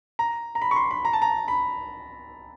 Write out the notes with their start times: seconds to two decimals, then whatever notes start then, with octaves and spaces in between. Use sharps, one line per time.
0.19 A#5
0.55 A#5
0.62 B5
0.71 C#6
0.76 C6
0.91 B5
1.05 A#5
1.13 A5
1.22 A#5
1.48 B5